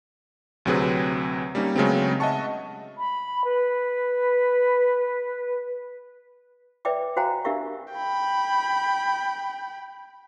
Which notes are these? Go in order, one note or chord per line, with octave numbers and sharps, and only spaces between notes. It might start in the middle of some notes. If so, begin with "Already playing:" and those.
D2 C3 F#3 C4 G#4 B4
G3 A#3 C#4 D#4
C#3 F#3 G#3 A3 B3 C4
D#5 E5 F#5 A5 C#6
B5
B4
B4 D5 E5 G5 D6
F#4 C5 F5 G5 G#5 A#5
D4 G4 A#4 E5 F5 C#6
G5 B5